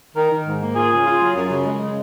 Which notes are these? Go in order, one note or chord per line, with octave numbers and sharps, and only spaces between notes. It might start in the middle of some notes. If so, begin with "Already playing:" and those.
D#3 A#4
D#3
G#2
A#3
F4 G#4
C#3
F4
F#3
F#2
C#3
G#3
C#3